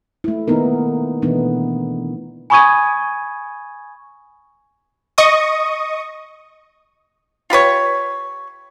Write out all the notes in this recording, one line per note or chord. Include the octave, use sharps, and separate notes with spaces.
A3 E4
D#3 A#3 B3 D#4 A#4
B2 E3 A3 B3 D4 D#4
G#5 B5 C#6 D#6 G#6 D#7
D#5 C#6 D#6
F4 G4 B4 C#5